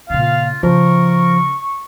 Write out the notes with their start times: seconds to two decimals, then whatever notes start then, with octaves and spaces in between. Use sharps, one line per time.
0.10 A#2 C#3 F4 F5
0.63 C#3 F3 A#4 C#6